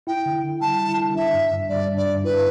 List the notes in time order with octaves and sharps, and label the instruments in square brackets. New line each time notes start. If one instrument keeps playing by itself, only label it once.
[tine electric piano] E4 [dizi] G5
[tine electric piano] D3
D3
[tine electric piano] G3 [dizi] A5
[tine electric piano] E4
D3
[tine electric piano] D4 [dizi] E5
[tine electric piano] G2
G2
[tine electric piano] G3 [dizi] D5
[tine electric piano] D4
[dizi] D5
[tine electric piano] G2
[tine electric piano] E4 [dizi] B4